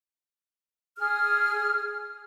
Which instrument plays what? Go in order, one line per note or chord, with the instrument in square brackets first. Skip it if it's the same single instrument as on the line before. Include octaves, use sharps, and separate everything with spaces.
[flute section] G#4 F6